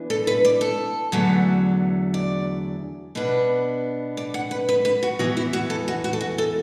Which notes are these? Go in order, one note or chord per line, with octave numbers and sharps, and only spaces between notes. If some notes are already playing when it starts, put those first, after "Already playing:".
Already playing: E3 B3 D4
A4
B4
D5
A4
E2 D3 F#3 A3
D5
B2 B3 D4 B4
D5
F#5
B4
B4
B4
F#4
E2 E3 B3 F#4
E4
F#4
A4
F#4
F#4
A4
F#4
A4